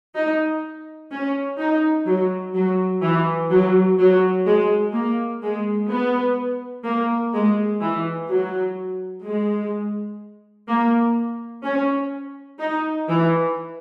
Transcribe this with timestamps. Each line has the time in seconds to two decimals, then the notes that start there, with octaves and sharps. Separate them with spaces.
0.15 D#4
1.11 C#4
1.58 D#4
2.06 F#3
2.54 F#3
3.02 E3
3.51 F#3
3.98 F#3
4.46 G#3
4.93 A#3
5.42 G#3
5.90 B3
6.85 A#3
7.34 G#3
7.81 E3
8.29 F#3
9.25 G#3
10.68 A#3
11.64 C#4
12.59 D#4
13.08 E3